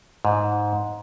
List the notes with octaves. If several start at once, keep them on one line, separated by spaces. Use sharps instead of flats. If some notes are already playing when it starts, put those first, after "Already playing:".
G#2